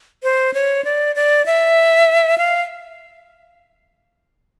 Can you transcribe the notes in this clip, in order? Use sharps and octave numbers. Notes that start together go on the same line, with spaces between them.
C5
C#5
D5
D5
E5
F5